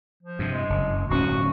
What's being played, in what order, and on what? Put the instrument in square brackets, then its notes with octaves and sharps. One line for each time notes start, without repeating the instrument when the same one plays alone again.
[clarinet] F3
[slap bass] G2 C3
[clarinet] G#3
[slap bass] F#1
[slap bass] D1 C4 C#4 [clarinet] F#4